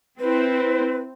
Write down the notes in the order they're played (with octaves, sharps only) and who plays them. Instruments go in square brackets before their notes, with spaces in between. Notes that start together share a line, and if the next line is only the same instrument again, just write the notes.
[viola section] C4 E4 C5 [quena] B4